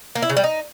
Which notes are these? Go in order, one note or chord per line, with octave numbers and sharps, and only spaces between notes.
A#3
E4
C#3
G3
D#4